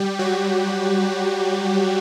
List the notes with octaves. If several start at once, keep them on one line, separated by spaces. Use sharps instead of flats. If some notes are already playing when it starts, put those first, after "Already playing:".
Already playing: G3 G4
F#3 F#4